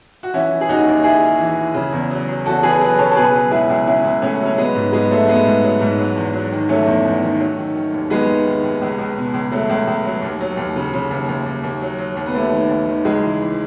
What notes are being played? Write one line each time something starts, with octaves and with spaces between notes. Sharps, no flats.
F#4
E3 C#4 E4
E3
G#4
D#2 D#4 F#4
D#2
D#2 E4 G#4
D#2
E3
E3
C#3
E2
F#3
F#3
E2 F#4 A4
E2 G#4 B4
F#3 G#4 B4
C#3 A4 C#5
A4
B2 G#4 B4
F#3
C#2 E4 G#4
C#2
C#2 C#4 E4
C#2
C#2 A3 C#4
F#3
C#4
F#3 G#3 B3
G#2
G#2 G#3 B3
F#3 A3
F#3 G#3 B3
G#2
F#3
G#2
F#3
E2
F#3
D#3
F#3 A3 C#4
E2
E2
D#3
F#3
D#3
D#3
D#2
D#2 G#3 B3
D#3
D#3
D#2
C#2
C#2
B2
C#2
F#3 A3
C#2
C#2
F#3
D#2
F#3
D#2
C#3
C#3
D#2
D#2
D#2
D#2
F#3
F#3
D#2
B3
D#2 A3
D#3
D#2
D#3
C#2 G#3
E3
E3